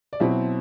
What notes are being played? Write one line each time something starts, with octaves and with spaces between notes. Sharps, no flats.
D5
B2 F#3 C4 E4 E5